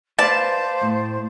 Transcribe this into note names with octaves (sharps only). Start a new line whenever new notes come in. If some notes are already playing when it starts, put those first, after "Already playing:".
B4 C5 D5 F5 A5
A2